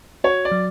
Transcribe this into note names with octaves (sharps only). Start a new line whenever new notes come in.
F#4 C#5
D5
F#3